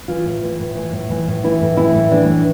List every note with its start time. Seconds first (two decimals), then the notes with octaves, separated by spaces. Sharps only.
0.08 E3 F4
0.26 A2
0.43 E3
0.60 A2
0.75 E3
0.92 A2
1.10 E3
1.27 A2
1.44 E3 E4
1.61 A2
1.77 E3 E4
1.95 A2
2.11 E3 D4
2.29 A2